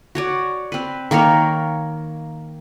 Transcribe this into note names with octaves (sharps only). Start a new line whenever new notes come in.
F#4 C#5 D5
C4 B4
D#3 A#3 A#4 C#5